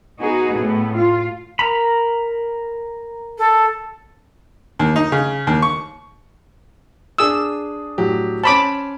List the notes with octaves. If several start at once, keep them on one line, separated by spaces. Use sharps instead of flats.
B3 D#4 F#4 G#4
A2 A3 B3
F4
A#4 A#5 B5
A4
D#2
D#4
C#3
D#2
C#6
D4 G#4 D#6 E6
A2 F#3 G4
C#4 C5 A5 B5 D6